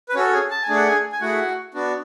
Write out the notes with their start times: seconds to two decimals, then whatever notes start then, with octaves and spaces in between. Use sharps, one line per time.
0.09 B4
0.15 C#4 F#4 A4 C#5
0.33 G#4 G#5
0.51 A5
0.63 G#5
0.69 A3 D4 G#4
0.76 F#5
0.87 G#4 G#5
1.12 G#5
1.21 A3 E4 F#4 G#4 F#5
1.74 B3 D4 F#4